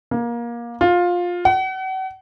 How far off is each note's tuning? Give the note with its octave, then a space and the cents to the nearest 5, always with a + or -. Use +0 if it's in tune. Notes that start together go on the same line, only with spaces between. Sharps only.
A#3 +25
F4 +15
F#5 +40